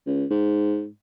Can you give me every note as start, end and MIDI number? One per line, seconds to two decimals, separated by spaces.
0.07 0.25 37
0.30 0.87 44